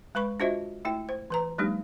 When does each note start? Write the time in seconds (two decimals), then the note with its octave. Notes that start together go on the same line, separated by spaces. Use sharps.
0.15 G#3 B4 B5 C#6
0.40 D4 F4 F#4 C5 D#5 E5
0.85 A3 E4 G5
1.09 C5
1.30 E3 B4 A#5
1.58 F#3 G#3 A#3 D4 D#4 G4